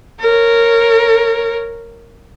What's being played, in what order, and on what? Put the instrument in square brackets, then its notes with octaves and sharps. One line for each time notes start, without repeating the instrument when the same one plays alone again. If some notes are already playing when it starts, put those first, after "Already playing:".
[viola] A#4 C#5